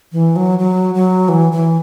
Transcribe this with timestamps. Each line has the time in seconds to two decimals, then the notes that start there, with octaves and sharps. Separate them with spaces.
0.12 E3
0.36 F#3
0.59 F#3
0.95 F#3
1.29 E3
1.52 E3